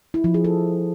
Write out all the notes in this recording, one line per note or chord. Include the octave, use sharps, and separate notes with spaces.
E4
F3
G#4
A4